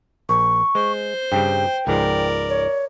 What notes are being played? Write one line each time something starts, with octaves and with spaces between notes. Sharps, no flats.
A#1 C#6
G#3 C5
G2 C#3 G3 G5
C#2 G#2 F3 A#4 D5
C#5